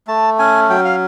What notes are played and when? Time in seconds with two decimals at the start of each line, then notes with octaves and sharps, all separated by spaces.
0.07 A3 A5
0.39 C#4 G#5
0.69 F#3 G5
0.85 F5